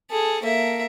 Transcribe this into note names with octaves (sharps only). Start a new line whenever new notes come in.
G#4 A4
A#3 E5